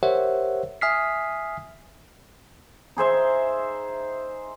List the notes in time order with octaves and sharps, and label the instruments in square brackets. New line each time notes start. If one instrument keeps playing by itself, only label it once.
[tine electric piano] G4 A#4 C5 C#5 E5 F#5
E5 G#5 D#6 F6 B6 C7
[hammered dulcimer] D#4 G#4 C5 E5